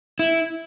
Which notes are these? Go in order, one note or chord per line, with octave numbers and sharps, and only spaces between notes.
E4